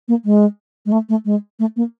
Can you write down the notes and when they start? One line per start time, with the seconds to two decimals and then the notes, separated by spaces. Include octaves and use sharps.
0.08 A#3
0.25 G#3
0.86 G#3
0.92 A3
1.09 A3
1.25 G#3
1.59 A3
1.76 A#3